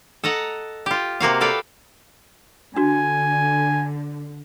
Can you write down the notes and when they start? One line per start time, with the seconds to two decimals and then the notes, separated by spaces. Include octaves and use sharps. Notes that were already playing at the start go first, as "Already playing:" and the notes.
0.24 A4 D#5 F#5 A#5
0.86 F4 G4
1.20 C3 A#3 F#4 F5
1.40 F#4 A4 B4 D5 F5 G5
2.76 D3 D4 F#4 G#5